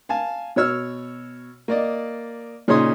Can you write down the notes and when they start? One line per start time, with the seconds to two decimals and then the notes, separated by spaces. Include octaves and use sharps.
0.09 F5 G#5 A5
0.56 B2 C#5 E6 F6
1.68 A#3 D5 D#5
2.68 A#2 C#3 D#4 C#5 C6 D#6